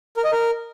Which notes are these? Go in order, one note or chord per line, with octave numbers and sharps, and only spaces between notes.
A#4
D#5
A#4